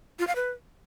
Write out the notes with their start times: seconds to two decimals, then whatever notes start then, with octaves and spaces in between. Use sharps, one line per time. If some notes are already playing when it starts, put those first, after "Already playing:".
0.19 F4
0.27 F5
0.36 B4